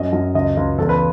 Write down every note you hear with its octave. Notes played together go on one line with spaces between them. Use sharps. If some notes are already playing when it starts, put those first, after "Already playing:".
Already playing: F#2 C#4 D#5
F#2
C#2 D#5
C#2
E2 A4
B4